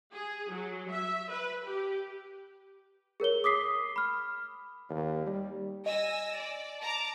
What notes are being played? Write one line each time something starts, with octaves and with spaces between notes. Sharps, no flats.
G#4
F#3
E5
B4
G4
G#4 A#4 C#5 G7
D6 D#6 B6 C7
B5 F6
D#2
G3
D#5 G#5 E6 A#6
D5
A5 A#5 D6